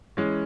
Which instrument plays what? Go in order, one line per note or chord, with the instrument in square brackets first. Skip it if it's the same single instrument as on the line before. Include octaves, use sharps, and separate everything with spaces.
[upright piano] E3 G#3 C#4